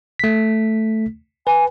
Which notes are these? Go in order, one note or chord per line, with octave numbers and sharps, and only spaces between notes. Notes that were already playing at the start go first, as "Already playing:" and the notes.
A3 B6
B4 G#5